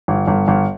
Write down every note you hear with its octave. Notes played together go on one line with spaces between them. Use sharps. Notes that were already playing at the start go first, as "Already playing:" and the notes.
G1
G1
G1